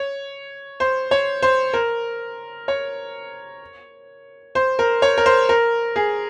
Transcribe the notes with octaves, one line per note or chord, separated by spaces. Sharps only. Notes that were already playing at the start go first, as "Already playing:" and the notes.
Already playing: C#5
C5
C#5
C5
A#4
C#5
C5
A#4
C#5
A#4
C5
A#4
G#4